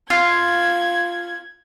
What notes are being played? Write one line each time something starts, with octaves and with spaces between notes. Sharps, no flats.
F4 G#6